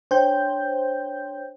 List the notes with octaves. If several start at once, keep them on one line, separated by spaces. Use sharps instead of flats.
D4 C5 C#5 G5 G6